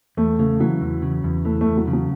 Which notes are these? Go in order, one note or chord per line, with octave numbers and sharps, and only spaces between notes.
E2 A3
C#3 A3
E3 F#3
E2
C#3
E2
E3 A3
A3
E2
F#3
C#3
F#3